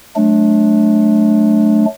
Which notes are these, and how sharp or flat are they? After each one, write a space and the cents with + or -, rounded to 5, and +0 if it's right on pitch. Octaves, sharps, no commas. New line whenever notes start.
F#3 +0 A3 -30 D4 +0